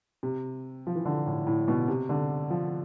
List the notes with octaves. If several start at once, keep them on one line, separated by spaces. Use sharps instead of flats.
C3
F3
E3
D3
A2
A2
B2
C3
D3
F3